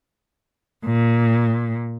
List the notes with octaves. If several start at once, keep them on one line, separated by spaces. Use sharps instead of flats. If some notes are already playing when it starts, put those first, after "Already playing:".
A#2